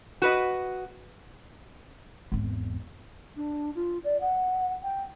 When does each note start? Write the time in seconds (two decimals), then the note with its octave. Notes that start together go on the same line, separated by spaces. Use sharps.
0.22 F#4 B4 D#5
2.32 G#1 E2
3.36 D4
3.75 F4
4.04 D5
4.21 F#5
4.83 G5